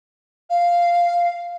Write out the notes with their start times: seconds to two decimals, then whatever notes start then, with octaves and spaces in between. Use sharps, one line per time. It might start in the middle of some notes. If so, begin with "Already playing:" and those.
0.50 F5